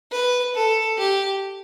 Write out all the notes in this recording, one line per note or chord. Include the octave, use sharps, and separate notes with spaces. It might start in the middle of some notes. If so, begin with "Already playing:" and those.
B4
A4
G4